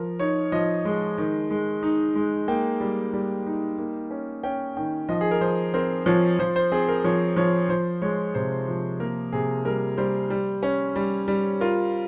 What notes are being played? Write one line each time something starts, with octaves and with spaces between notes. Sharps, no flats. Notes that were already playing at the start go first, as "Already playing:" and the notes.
Already playing: F3 A#4
D#4 C#5
F3 D#5
G#3
D#3
G#3
D#4
G#3
A#3 G5
G3
G3
D#4
A#3
C#4
C#4 G5
D#3 G5
F3 D#5
G#4
A#4
F3 C5
C4 A#4
F3 C#5
F3 C5
C5
C4 G#4
A#4
F3 C#5
F3 C#5
F3 C5
G#3 C#5
C3 C5
F3
A#3 A#4
C3 G#4
G3 A#4
G3 C5
G3
C#4
G3
G3
F4 A#4